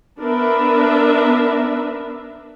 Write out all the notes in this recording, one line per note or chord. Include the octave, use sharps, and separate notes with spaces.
B3 D4 A#4 B4 E5